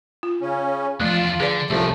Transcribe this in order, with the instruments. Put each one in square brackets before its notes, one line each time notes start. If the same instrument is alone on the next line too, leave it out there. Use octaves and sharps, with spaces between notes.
[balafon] F4
[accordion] C#3 C#4
[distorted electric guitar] E2 D4 [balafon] F3 A3 [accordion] F4
[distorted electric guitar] D3 [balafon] G#4 B4 D5
[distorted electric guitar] C2 [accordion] F#2 A2 [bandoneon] F3 A3 [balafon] G4